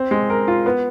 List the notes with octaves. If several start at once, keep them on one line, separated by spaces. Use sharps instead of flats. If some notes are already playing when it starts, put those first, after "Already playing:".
Already playing: C4
G#3
A#4
F4
B3